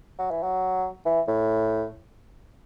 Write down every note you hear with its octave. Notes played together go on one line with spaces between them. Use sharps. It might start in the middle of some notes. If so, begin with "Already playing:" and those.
F#3
E3
F#3
E3
A2